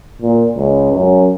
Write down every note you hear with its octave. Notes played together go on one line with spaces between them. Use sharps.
A#2
C#2
F#2